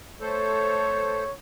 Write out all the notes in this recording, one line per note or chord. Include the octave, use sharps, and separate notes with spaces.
A3 A4 C5 C#5